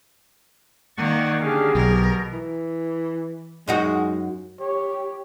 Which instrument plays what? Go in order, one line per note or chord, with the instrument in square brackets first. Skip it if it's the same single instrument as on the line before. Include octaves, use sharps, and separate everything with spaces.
[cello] D#3 A#3 [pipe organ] D5 F#5 C#6
[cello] D3 [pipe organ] C#4 D4 F5 [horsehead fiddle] G4 G#4
[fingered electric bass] B1 [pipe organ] B2 [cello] A#4
[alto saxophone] E3
[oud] F#2 D#4 F#4 [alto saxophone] G#3
[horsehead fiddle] G4 [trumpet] C#5